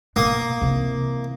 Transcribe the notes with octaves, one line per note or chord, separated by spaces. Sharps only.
B2 A#3 D#6
C3 E3